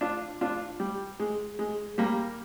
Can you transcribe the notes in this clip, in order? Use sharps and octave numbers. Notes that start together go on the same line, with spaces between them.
D4 F4
D4 F4
G3
G#3
G#3
G3 A#3